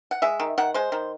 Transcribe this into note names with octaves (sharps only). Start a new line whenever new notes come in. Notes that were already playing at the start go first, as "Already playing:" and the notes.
F#5
G#3 E5
D#3
D#3 F#5
G#3 C5
D#3